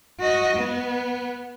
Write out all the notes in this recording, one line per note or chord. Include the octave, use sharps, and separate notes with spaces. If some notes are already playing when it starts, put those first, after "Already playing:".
F#4 D#5
B3